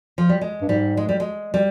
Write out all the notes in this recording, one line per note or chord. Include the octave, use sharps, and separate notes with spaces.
F3
G3
G#3
G2
G#2 G3
G#3
G3
G#3
G3